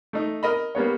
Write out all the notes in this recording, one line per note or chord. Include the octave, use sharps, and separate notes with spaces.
A3 D#4
A#4 D#5 B5
G3 A#3 B3 C#5